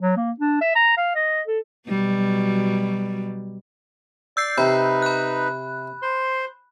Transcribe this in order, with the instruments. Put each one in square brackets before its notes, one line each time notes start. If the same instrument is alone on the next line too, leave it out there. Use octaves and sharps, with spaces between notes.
[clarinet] F#3
A#3
D4
E5
A#5
F5
D#5
A4
[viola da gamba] B2 F#3 G3
[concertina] D5 [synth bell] E6 G6 C7
[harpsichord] C3 [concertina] D#4 B4 [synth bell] B5
[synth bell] B5 F#6
[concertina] C5 C6